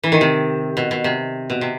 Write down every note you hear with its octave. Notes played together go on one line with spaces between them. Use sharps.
E3
D#3
C3
B2
B2
C3
B2
C3